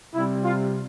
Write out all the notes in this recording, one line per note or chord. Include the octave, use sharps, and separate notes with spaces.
C3 G3 E4
F4